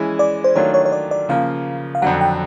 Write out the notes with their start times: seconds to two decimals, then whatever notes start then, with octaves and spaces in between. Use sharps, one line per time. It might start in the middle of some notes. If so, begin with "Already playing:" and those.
Already playing: E3 G#3 C#4 E4
0.19 D5
0.44 C5
0.56 D#3 F#3 A3 D4 F4 C#5
0.74 C#5
0.86 C#5
0.92 D5
1.11 D5
1.29 C#3 F3 A#3 F5
1.95 F5
2.02 F2 D3 F#3 F#5
2.21 G5